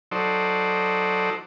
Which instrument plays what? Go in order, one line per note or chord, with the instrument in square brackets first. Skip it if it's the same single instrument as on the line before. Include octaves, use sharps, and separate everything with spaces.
[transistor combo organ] F#3 D#4 A4 C5 D5